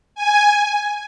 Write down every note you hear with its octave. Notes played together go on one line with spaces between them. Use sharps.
G#5